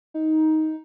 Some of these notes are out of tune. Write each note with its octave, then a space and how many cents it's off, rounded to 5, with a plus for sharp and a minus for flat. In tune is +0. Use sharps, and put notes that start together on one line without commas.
D#4 +10